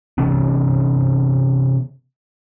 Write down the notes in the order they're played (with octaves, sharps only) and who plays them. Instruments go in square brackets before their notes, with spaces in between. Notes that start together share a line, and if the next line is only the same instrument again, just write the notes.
[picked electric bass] C3 E3 B3 C#4